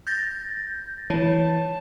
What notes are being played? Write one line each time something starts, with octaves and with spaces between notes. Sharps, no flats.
G6 A6 A#6
E3 C#5 A5